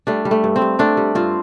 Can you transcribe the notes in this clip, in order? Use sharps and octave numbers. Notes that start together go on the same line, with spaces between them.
G3 A3 D4
G3
A3
G2
C4
G2
G3 A3 D4
G3
G2 C4 F4